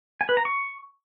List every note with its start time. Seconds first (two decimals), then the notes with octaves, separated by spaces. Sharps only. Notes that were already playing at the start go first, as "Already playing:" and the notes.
0.21 G#5
0.29 B4
0.37 A#5
0.45 C#6